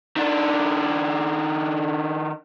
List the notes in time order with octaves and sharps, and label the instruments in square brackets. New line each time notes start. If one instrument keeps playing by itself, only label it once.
[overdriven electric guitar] D#3 D4